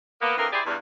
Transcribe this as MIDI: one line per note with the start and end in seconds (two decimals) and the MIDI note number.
0.22 0.34 58
0.22 0.34 59
0.37 0.47 41
0.37 0.47 50
0.37 0.47 52
0.37 0.47 58
0.37 0.47 70
0.37 0.47 75
0.53 0.61 64
0.53 0.61 67
0.53 0.61 68
0.53 0.61 72
0.53 0.61 74
0.66 0.75 40
0.66 0.75 43